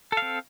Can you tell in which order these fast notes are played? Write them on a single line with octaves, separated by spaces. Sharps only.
A4 F5 C4